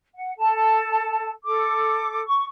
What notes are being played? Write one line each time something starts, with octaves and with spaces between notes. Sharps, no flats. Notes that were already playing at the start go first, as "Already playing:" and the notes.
F#5
A4 A5
A4 D6
C#6